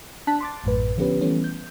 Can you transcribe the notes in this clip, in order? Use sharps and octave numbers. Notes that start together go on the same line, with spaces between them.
D4 A5 F#6 B6
C6 D6 A6
A1 F#2 A2 B4
D3 F3 B3 C#4 G4 B4
E3 G3 A3 B3 C#4
G6